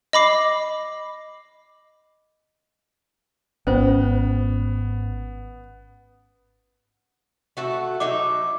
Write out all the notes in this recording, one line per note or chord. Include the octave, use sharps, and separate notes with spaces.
D#5 B5 D6 C7
G#1 B3 C#4 F4 C5
A3 F#4 E5
F#3 D#4 E5 D6